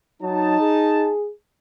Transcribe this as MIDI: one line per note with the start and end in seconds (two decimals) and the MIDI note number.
0.22 0.58 54
0.22 1.11 63
0.22 1.11 81
0.61 1.31 68